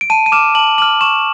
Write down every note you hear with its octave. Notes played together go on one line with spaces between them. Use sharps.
D7
A5 D#7
D#7
D6 F6 E7
A5 F#7
D6 F6 F#7
C#6 E7